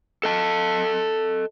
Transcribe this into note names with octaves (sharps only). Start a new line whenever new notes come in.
A4 D#5 A5